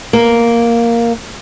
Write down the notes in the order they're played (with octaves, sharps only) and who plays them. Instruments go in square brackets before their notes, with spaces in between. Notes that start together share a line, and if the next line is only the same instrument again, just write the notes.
[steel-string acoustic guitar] A#3